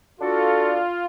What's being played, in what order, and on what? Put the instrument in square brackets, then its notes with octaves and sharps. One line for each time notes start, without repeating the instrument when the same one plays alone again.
[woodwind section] D4 F#4 A4 [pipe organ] F4